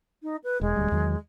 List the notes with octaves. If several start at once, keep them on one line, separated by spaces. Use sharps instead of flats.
D#4
B4
E1 G#3
D#1 D2 G3
E2 D#3 F#3